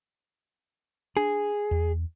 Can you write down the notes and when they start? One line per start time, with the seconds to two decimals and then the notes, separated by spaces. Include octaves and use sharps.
1.17 D4 G#4
1.71 E2